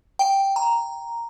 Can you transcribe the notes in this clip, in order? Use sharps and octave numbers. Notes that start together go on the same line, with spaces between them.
G5
A#5